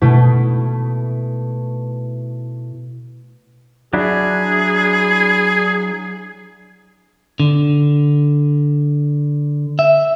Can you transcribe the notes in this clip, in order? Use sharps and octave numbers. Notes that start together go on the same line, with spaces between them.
B2 A3 E4
F#3 D4 E4 G#4
D3
E5